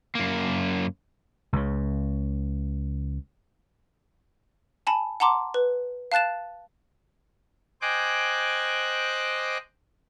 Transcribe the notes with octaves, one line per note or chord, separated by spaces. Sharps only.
F#2 A#3
C#2 C#3
G#5 A5 B5
F#5 A5 A#5 C6 D6
B4
F5 A5 F#6 A6 E7
C5 D#5 G5 G#5 D6 F#6